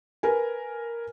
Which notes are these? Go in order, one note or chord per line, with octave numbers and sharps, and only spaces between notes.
A#4 B4 G#5